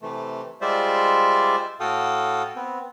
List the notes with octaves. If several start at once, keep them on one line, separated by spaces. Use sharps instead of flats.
C3 E3 A3
G3 G#3 F4 C5 D5 E5
A2 F#4 A4 F5 G5 D#6
B3 C4